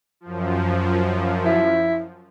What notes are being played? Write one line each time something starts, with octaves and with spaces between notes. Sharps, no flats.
F#2 F3
E4